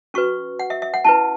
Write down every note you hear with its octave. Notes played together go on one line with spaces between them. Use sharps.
C#4 F#4 B4 C#6
F#5
E5
E5
F#5
C#4 E4 B4 A5